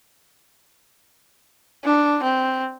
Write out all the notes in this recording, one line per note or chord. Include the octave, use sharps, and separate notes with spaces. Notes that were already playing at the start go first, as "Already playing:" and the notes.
D4
C4